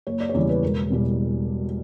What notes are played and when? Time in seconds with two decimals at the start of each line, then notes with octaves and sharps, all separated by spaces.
0.07 F#1 C#5
0.20 D5
0.29 C#5
0.34 E2 C#3 E3 G3 D5
0.49 B4
0.63 E1 A#4
0.90 E2 B2 G3